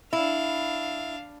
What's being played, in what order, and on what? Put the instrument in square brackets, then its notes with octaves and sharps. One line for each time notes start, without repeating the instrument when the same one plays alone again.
[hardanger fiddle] D4 F5 [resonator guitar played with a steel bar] E4